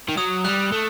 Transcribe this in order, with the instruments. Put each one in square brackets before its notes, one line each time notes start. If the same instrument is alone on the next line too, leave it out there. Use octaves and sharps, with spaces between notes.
[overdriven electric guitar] D#3
[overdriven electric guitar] F#3 [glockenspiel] D#6
[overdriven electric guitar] G3 [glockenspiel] F#6
[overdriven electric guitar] A3